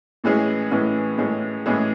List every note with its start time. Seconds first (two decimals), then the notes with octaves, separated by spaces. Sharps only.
0.24 A2 E3 G#3 C#4 G#4
0.71 A2 E3 G#3 C#4 G#4
1.18 A2 E3 G#3 C#4 G#4
1.66 A2 E3 G#3 C#4 G#4